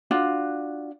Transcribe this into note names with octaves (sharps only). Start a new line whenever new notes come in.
D4 F4 F#4